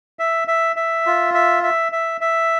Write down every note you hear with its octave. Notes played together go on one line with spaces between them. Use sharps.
E5
E5
E5
F4
E5
E5
E5
E5